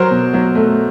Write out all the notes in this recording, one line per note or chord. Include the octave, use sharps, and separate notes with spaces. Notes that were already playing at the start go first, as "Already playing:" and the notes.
Already playing: F#3 A#4 C5
B2
F#3
A3